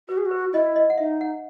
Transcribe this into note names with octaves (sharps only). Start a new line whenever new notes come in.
F#4 B4
G#4
F#4
B4
E4 D#5
D#5
F#5
D#4 E5
F#5